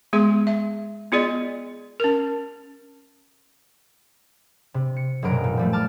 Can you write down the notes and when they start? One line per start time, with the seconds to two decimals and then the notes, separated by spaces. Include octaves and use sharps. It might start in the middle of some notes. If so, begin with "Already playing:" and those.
0.13 G#3 B3 G#4 C6
0.47 E5
1.12 B3 F4 G#4 D5 D#5
2.00 C#4 A#4
4.74 C3
4.97 C#7
5.22 D#1 F#2 B2 F#3 A#4 D7
5.44 A#2
5.57 F3 G3 A3
5.73 A5 D6 F6